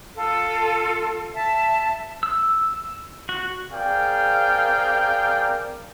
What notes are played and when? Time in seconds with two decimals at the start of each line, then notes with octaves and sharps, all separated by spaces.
0.15 F4 A4
1.34 E5 A5
2.23 E6
3.29 F#4
3.72 C4 G#4 A#4 D5 F5 G5